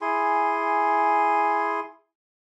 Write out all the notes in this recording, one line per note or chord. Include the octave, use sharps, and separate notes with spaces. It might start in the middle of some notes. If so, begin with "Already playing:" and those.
E4 G#4 G#5 C6